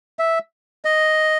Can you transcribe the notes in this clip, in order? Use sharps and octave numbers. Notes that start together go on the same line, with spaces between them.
E5
D#5